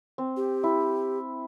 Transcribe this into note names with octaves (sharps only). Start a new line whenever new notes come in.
C4
G4
E4